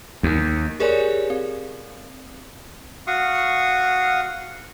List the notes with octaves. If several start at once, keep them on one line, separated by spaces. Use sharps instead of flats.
D#2
G4 G#4 A#4 C#5 D5 G#5
C4
F#4 F5 C#6 D#6